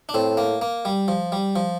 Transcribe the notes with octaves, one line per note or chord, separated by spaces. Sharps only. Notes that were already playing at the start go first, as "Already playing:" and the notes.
D4
A2 C4
A#3
A#3
G3
F3
G3
F3